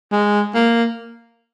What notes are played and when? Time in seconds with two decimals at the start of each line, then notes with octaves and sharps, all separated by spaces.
0.12 G#3
0.55 A#3